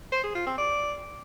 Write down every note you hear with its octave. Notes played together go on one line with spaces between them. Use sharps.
C5
G#4
F4
C4
D5